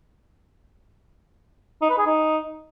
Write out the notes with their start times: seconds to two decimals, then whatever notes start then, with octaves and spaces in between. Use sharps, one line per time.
1.81 D#4
1.90 B4
1.98 G#4
2.06 D#4